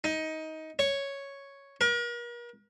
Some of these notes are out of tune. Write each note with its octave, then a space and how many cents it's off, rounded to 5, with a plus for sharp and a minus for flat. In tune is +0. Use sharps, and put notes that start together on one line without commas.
D#4 +20
C#5 +0
A#4 +40